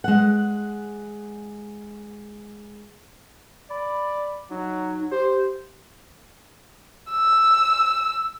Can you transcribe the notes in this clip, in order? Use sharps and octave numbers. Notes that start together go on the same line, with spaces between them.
G#3 F#5
D5 B5
F#3 D#4
G4 C5
E6